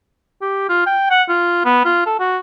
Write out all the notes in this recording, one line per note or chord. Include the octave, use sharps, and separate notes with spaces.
G4
F4
G5
F#5
F4
B3
F4
A4
F#4